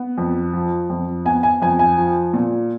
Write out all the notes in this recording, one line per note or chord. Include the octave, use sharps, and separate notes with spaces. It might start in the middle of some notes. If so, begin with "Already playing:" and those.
Already playing: B3
F2
F3
F2
B3 G#5
G#5
F2 G#5
G#5
F3
A#2